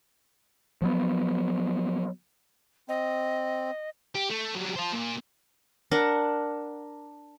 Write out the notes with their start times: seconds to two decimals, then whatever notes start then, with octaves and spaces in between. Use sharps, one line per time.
0.82 F3 F#3 B3
2.89 C4 D#5
4.15 G4
4.30 A3
4.55 F#3 G3
4.76 F4 C5
4.93 A#2
5.91 D4 A#4 F#5